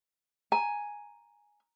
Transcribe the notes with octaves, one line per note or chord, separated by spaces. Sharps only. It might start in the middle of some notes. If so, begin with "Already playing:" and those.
G#5 A#5